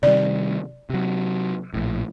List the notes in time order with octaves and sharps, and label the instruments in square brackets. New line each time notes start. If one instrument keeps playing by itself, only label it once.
[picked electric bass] C3 D#3 G3 [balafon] D5
[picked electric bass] C3 F#3
A#1 A2